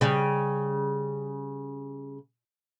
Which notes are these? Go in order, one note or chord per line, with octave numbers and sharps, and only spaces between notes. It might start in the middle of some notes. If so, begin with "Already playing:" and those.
C#3 G3